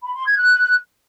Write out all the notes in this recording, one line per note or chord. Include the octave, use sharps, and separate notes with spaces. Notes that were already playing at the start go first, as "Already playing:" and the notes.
B5
C6
G#6
F#6